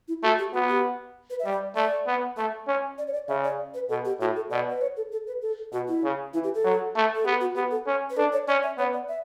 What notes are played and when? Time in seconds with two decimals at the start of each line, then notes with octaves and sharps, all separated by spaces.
0.08 E4
0.23 A3 F#4
0.39 G4
0.53 B3 F#4
0.69 G4
1.30 B4
1.40 E5
1.45 G3 D5
1.75 A3 D5
2.06 B3
2.37 A3 E5
2.68 C#4
2.98 D5
3.07 C#5
3.13 D5
3.28 C#3 E5
3.44 D5
3.74 B4
3.89 B2 A4
4.05 G4
4.20 A2 F#4
4.36 A4
4.50 B2 D5
4.69 B4
4.81 C#5
4.97 A4
5.12 A4
5.27 B4
5.42 A4
5.72 B2 F#4
5.88 E4
6.03 C#3
6.34 E3 E4
6.44 G4
6.55 A4
6.64 F#3
6.95 A3
7.16 A4
7.25 B3 G4
7.41 F#4
7.56 B3 G4
7.71 A4
7.87 C#4
8.10 B4
8.17 D4 A4
8.33 C#5
8.48 C#4 D5
8.63 E5
8.78 B3 C#5
8.93 D5
9.08 E5